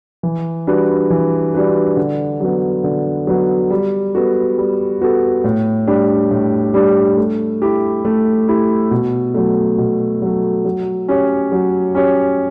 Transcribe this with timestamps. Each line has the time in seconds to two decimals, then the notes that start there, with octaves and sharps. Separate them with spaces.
0.23 E3
0.67 G3 D4 F#4 B4
1.10 E3
1.54 G3 D4 F#4 B4
1.97 D3
2.40 F#3 B3
2.84 D3
3.27 F#3 B3
3.70 G3
4.14 B3 F#4 A4
4.58 G3
5.01 B3 F#4 A4
5.44 A2
5.87 G3 D4 G4
6.31 A2
6.74 G3 D4 G4
7.17 A3
7.62 E4 G4
8.05 A3
8.48 E4 G4
8.91 B2
9.34 F#3 A3
9.78 B2
10.22 F#3 A3
10.65 F#3
11.08 C#4 G4 C#5
11.52 F#3
11.95 C#4 G4 C#5